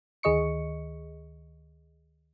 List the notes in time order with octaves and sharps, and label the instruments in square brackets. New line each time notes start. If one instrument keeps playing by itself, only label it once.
[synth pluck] D2 D#3 G#4 D#5 C#6 C#7